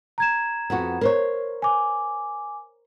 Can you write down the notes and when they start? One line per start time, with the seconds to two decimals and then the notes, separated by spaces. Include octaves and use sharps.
0.18 A#5 G#6 E7
0.70 F2 B3 F#4
1.01 A#4 C5 C#5
1.62 G#5 D6